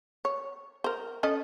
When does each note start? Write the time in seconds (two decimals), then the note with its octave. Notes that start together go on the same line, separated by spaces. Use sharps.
0.25 C#5
0.84 A#4 C5
1.23 C#4 A4 D#5